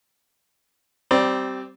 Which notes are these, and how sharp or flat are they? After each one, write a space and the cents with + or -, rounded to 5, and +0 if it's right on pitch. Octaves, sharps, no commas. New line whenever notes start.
G3 -25 C4 -5 D5 +0